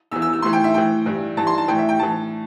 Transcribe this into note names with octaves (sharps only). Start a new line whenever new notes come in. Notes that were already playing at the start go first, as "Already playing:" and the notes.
E2 E3 E6
E6
E6
A2 E3 C6
G5
E5
A2 E3 G5
G2 E3
G2 E3 A5
C6
A5
A2 E3 G5
E5
G5
A2 E3 A5